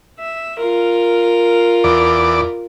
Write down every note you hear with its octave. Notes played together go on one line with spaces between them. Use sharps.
E5
F4 A#4
E2 D5